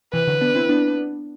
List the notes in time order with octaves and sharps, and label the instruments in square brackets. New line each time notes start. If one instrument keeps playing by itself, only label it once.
[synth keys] C3 E3 [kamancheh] B4
[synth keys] D3 F#3
B3 D4
C4 E4
B3 D4